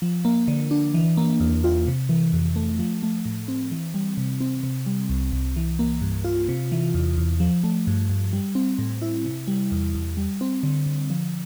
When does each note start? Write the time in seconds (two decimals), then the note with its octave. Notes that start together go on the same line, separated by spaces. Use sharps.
0.02 F3
0.25 A#3
0.48 D3
0.71 D4
0.94 E3
1.17 A#3
1.40 E2
1.64 F4
1.87 C3
2.09 E3
2.33 F2
2.56 A3
2.79 F3
3.03 A3
3.26 A2
3.48 C4
3.72 E3
3.94 G3
4.17 C3
4.40 C4
4.64 C3
4.86 G3
5.10 C2
5.32 C2
5.56 E3
5.79 A#3
6.02 G2
6.25 F4
6.49 C3
6.72 E3
6.95 E2
7.18 E2
7.40 F3
7.64 A3
7.87 G2
8.09 G2
8.33 G3
8.55 C4
8.79 A2
9.02 E4
9.25 C3
9.48 G3
9.72 E2
9.95 E2
10.17 G3
10.41 C4
10.63 D3
10.86 D3
11.10 F3